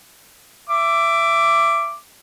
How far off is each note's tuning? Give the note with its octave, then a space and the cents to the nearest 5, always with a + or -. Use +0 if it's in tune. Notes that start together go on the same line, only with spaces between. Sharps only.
E5 +20 D6 +0